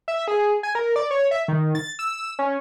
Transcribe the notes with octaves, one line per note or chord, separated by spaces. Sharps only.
E5
G#4
G#5
A#4
D5
C#5
E5
D#3
A6
E6
C#4